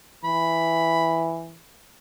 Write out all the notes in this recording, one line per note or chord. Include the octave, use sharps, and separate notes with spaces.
E3 B5